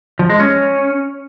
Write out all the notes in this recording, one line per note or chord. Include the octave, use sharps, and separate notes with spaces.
F3
G#3
C#4